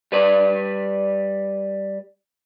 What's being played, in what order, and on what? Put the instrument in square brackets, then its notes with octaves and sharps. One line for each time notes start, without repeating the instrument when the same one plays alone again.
[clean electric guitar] G3 B4 D5